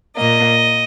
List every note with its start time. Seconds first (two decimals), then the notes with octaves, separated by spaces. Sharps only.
0.15 A#2 A#3 D#5